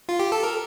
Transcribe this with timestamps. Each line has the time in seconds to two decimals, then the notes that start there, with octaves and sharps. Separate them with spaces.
0.09 F4
0.20 G4
0.32 A4
0.43 A#4